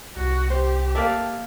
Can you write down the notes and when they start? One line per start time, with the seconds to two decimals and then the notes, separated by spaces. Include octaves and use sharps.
0.16 C2 F#4
0.50 G4 C5
0.95 A#3 A4 D5 E5